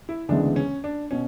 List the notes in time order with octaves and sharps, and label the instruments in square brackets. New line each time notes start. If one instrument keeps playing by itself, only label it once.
[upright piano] E4
[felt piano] D2 C#3 E3 G#3 B3 [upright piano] D4
[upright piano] C#4
D4
[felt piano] B2 [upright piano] C#4